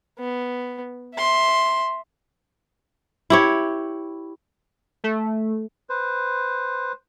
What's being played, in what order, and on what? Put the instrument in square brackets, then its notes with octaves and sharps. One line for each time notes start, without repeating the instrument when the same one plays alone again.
[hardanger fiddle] B3
E5 C6
[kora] E4 G4 C#5
[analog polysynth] A3
[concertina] B4 C5